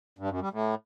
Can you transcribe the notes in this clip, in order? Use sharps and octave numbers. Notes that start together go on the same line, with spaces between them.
G2
F#2
G3
A2